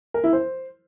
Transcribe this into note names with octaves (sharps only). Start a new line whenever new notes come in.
A#4
E4
C5